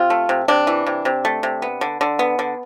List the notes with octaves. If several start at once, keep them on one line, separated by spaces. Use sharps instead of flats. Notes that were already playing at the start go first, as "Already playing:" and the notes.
Already playing: C3 F4
A3
C3
C3 D4
E3
C3
C3
A3
C3
B3
D3
D3
B3
D3